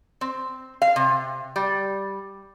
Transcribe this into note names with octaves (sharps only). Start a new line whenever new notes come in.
C4
F5
C3
G3